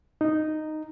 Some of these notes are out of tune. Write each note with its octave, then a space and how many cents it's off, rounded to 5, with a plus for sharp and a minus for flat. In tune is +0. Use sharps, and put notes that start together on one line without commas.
D#4 -5